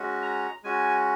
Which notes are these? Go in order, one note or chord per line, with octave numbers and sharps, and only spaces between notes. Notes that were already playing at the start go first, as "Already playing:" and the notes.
Already playing: G#3 C#4 F#4
A#5
G#3 C#4 F#4 G#5